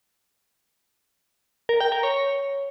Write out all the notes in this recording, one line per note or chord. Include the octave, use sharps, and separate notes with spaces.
A#4
G5
A#4
C#5